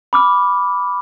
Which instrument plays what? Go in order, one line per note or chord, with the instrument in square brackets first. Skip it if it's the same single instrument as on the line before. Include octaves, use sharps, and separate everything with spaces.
[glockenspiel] B5 D6 F6